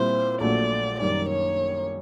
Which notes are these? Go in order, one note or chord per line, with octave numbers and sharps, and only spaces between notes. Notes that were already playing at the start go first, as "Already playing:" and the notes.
Already playing: A#2 G3 C4 E4 C5
A#1 A#2 F#3 A3 D5
F#2 D#3 G3 D5
C#5